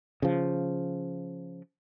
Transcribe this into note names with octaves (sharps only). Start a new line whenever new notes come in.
C#3 F3